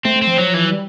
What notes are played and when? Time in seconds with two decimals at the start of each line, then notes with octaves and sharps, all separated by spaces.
0.05 A3 C4
0.16 A3
0.22 C4
0.27 F3
0.38 F#3
0.54 E3
0.65 F#3
0.72 G3